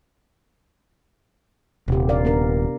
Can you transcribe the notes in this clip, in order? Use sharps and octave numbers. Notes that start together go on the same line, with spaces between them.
D#1 C3 G4
A#4 D5 F5
B3 D4 A#4